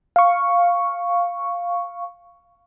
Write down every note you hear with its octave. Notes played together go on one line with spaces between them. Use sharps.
F5 C#6